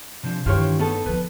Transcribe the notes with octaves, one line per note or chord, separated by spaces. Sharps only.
C3 F3 D4
G2 D#3 E3 D4 F4 G4 C#5
B3 D#4 A4
D3 F3 B4